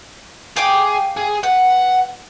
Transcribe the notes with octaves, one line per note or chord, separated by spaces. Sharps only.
G#4 F5 G5 D6
G#4
B4 F#5